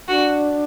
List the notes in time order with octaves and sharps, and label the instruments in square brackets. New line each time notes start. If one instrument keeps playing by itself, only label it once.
[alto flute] D4 [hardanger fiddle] F#4